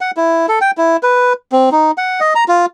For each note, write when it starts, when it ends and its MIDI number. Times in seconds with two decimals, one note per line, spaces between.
0.01 0.11 78
0.17 0.46 64
0.48 0.59 69
0.61 0.71 79
0.77 0.97 64
1.03 1.33 71
1.52 1.69 60
1.72 1.91 63
1.98 2.20 78
2.20 2.34 75
2.35 2.44 82
2.48 2.66 65